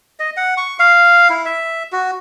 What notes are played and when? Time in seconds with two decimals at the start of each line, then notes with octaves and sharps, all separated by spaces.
0.20 D#5
0.37 F#5
0.57 C#6
0.79 F5
1.30 E4
1.46 E5
1.92 F#4